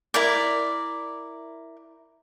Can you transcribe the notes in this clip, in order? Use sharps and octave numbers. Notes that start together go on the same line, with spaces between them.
E4 A#4 D5